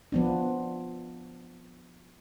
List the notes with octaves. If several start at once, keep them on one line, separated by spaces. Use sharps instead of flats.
F3 B3 D4